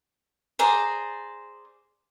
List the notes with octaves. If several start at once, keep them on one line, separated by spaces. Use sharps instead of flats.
G#4 C5 D5 A#5